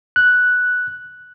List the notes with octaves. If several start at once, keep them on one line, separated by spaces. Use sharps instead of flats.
F#6